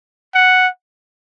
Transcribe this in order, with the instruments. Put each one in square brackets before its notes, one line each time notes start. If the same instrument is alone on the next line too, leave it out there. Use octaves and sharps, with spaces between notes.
[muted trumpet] F#5